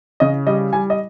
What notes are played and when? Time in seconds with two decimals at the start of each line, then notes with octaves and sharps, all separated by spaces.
0.20 C#3 D#5
0.47 G3 D#5
0.73 G3 G#5
0.90 D#5